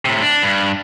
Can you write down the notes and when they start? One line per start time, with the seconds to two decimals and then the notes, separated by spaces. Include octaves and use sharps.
0.05 A2 C3
0.22 D4
0.43 G2